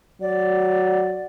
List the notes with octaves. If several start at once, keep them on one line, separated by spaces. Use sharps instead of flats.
F#3 D5